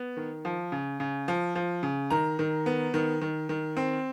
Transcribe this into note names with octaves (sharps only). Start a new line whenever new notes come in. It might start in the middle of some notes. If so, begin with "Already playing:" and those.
Already playing: B3
D#3
F3
C#3
C#3
F3
F3
C#3
D#3 A#5
D#3
B3
D#3
D#3
D#3
C4